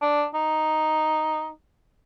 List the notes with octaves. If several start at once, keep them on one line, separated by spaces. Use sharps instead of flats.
D4
D#4